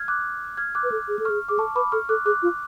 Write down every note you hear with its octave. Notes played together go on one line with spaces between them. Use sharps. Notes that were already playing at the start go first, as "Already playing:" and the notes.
Already playing: F6 G#6
D6 F#6
F6 G#6
D6 F#6
B4
A4
G#4
A4
G#4 C#6 F6
G#4 D6
A4 A5 C#6
B4 B5 D6
A4 C#6 F6
A4 D6 F#6
G#4 D6 F#6
F4